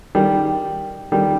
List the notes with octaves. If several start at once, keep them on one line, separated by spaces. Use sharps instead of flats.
D#3 G3
D#3 G3